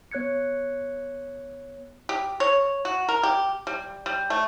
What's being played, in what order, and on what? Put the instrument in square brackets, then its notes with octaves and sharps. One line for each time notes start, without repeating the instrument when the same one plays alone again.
[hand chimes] B3 C#5 F#6 G#6 C#7
[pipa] G4
C#5
F#4
A#4
G4
G3
G3
A3